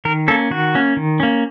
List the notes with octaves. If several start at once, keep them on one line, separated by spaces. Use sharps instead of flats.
D#3 A#4
A#3 C#4 A4
D#3 F#4
A#3 C#4
D#3
A#3 C#4